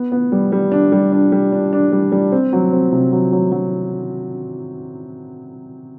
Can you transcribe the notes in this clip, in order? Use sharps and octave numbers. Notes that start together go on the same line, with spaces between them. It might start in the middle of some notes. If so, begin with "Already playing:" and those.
Already playing: B3
B3
G3
G3
D4
G3
D4
G3
D4
D4
G3
G3
C4
F#3
C4
C3
F#3
F#3
F#3